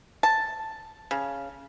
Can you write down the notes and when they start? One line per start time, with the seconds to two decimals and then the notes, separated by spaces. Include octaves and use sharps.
0.23 A5
1.11 C#3